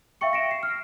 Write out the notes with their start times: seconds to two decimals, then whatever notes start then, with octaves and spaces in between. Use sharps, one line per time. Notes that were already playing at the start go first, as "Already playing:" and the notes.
0.21 E5 F5 G5 C#6 C#7
0.33 A#6 C#7 D7 E7
0.51 C7
0.63 F6